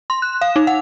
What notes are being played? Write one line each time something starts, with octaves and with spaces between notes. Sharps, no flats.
C6
F#6
F5
D#4
F#5